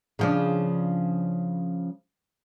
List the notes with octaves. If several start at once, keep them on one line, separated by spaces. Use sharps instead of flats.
C#3 F3 D4